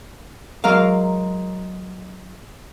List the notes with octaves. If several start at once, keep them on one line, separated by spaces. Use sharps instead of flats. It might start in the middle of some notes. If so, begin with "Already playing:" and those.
F#3 G#3 A#4 F5